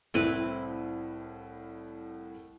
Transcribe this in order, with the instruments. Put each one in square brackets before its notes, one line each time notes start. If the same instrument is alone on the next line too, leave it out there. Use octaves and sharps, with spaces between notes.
[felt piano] C2 A2 [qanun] C4 E4 B4